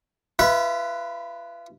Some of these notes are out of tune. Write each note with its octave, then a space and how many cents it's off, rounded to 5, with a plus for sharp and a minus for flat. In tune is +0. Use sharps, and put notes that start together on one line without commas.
F4 -40 B4 +0 E5 -20